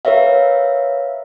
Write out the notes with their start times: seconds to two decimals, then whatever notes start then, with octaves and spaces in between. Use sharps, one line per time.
0.05 A#4 B4 C#5 E5 F5